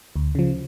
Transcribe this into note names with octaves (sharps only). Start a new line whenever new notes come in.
D2
C#3 F3